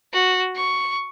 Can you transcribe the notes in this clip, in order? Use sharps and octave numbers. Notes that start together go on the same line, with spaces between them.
F#4
C#6